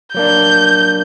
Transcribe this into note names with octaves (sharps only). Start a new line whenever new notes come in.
F#3 A#3 D4 G6